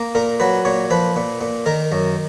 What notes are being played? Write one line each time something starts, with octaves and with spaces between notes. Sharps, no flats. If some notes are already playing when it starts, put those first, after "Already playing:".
Already playing: A#3
A#2 A#4
F#3 B4
A#2 C#5
F3 B4
A#2
A#2
D#3 A#4
F#2